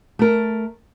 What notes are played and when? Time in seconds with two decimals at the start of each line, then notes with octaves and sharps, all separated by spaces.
0.19 A3 A#4